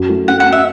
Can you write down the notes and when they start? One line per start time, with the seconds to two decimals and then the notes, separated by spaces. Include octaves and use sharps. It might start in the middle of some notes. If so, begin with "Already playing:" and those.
Already playing: F#2 F#4
0.09 A3
0.28 C#4 F#5
0.40 F#5
0.46 C#4
0.52 E5